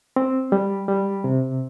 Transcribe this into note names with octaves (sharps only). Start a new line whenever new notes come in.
C4
G3
G3
C3